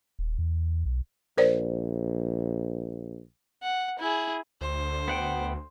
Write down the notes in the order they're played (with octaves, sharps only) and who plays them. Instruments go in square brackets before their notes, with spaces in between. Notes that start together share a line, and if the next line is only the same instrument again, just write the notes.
[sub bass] D#1
E2
B1
[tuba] A#1 [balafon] A#4 C5 D5
[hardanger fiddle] F#5
E4 G#4
[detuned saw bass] D2 [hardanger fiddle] C5
[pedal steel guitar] B3 F#5 G5